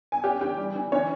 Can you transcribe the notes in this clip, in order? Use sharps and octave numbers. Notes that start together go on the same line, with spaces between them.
G#5
C#4 G4 G5
E3 G4 G5
G3
E3
E3 C#4 C#5